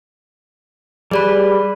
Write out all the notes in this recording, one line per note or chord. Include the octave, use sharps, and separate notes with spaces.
G3 G#4 B4 D5 B5